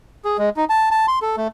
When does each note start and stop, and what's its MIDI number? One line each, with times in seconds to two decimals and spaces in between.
0.25 0.37 68
0.38 0.50 56
0.57 0.65 63
0.70 0.89 81
0.91 1.06 81
1.08 1.19 84
1.22 1.36 69
1.37 1.48 57